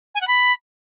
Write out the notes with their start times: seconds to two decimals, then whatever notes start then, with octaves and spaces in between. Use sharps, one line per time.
0.15 G#5
0.21 F#5
0.27 B5